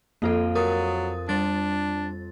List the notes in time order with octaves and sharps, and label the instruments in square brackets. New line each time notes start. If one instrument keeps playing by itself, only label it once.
[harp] F2 F5 D#7 [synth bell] A#3 F4 A4
[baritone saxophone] F#3 [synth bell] A#4 D#6 A6
[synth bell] G3 A6 [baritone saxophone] D4